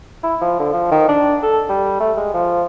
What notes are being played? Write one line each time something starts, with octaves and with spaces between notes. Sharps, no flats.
E4
F3
D3
F3
D#3
D4
A4
G3
A3
G#3
F3